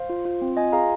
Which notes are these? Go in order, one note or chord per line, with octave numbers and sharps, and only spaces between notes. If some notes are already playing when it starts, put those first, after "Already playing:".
Already playing: C5 F5
F4
F4
C4
F4 D#5 G#5
G#4 F5 A#5